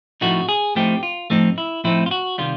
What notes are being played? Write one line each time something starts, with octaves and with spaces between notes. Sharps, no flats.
A2 F3 A3 C4 D#4 F#4
G#4
A2 F3 A3 C4 D#4 G4
F4
A2 F3 A3 C4 D#4
E4
A2 F3 A3 C4 D#4 E4
F4
F#4
C3 D#3 G3 F4